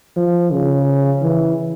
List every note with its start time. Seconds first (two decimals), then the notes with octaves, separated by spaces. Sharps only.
0.16 F3
0.51 C#3
1.22 E3